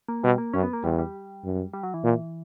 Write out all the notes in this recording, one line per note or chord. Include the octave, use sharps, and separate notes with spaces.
A#3
B2 G3
A#3
F#2 C#4
B3
A#3
E2 G3
G3
F#2
G3
F#3
E3
A#2